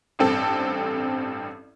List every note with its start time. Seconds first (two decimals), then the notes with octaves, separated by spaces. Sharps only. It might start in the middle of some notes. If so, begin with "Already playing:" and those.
0.19 A1 G2 C4 A4 A5